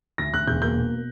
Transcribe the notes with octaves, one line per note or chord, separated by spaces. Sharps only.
D2 A#6
D2 F#6
E1 G6
A#3 G6
B2